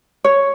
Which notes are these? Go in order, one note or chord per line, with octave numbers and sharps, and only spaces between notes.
C#5